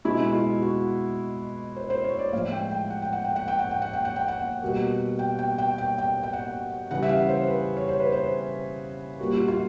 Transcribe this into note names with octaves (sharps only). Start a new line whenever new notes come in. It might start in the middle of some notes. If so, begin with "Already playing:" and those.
B2 G#3 E4
F4
F#4
C5
C5
C#5
D5
A2 F3 G#3 F5
G5
G5
F#5
G5
F#5
G5
F#5
G5
F#5
G5
F#5
G5
F#5
G5
F#5
B2 G3 A#3
G5
G5
G5
G5
G5
G5
F#5
C#3 E3 G3 F#5
E5
F5
C5
B4
C#5
C5
B4
C5
A#2 G3 A#3 F#4
F4
F4